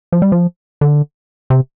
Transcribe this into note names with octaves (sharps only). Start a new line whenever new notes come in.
F3
G3
F3
D3
C3